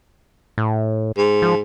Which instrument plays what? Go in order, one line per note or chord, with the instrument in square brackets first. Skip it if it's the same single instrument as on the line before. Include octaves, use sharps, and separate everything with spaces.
[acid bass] A2
[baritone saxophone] G#2
[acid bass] F3